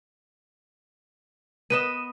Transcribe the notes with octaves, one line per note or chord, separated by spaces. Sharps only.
B3 B4 D#5 D#7 E7